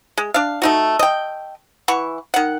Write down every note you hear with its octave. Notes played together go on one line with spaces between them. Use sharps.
G#3
D4 F5
A3 D#4 F#4
D#5 G5
E3 F#5 C#6
D#3 F#5